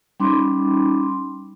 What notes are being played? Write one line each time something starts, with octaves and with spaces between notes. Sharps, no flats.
G3 C#4 D#4 B5 C6 D6